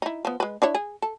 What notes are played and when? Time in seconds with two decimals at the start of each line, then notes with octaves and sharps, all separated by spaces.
0.02 D#4 E4
0.25 F3 B3
0.40 G#3 B4
0.62 D4 E4 C#5
0.75 G#4
1.02 A4